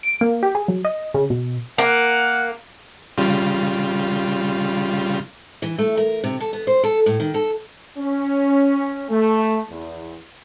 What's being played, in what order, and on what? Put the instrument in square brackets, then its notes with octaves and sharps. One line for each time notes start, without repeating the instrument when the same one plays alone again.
[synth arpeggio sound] D7
A#3
G4
G#4
F#3
D#5
C#3
B2
[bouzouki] A#3 [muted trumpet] F#5
[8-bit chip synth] C#3 G3 F4
[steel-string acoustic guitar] E3
A3
A#4
C3
A4
B3
C5
A4
A2
D#3
A4
[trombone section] C#4
A3
E2